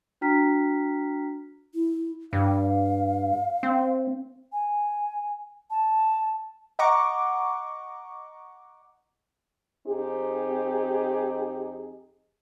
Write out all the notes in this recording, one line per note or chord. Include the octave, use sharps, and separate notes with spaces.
D4 F#4 G5 A#5 F6 B6
E4
G2 F5
C4
G#5
A5
D#5 F#5 A#5 C#6 D6
F2 C4 D#4 G4 G#4